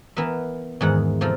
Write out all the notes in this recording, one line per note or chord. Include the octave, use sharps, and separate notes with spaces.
E3 B3 A#4 E5
E2 G#2 D#3 F#5
C3 F3 A4 A#4